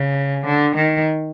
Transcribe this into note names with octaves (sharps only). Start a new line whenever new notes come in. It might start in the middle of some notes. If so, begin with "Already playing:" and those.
Already playing: C#3
D3
D#3